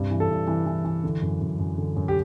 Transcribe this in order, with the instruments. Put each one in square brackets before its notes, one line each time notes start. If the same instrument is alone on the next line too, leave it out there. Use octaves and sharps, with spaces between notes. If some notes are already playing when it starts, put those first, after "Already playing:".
Already playing: [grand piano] G2 C3
E3
A4
G2
E3
E3
E3
D3
F#2
F#2
F#2
D3
F#2
G4